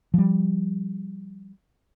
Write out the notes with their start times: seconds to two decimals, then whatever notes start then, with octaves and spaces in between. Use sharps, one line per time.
0.14 F3 G3